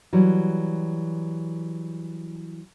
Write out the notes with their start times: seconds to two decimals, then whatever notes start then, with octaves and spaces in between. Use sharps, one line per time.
0.13 E3 F#3 G3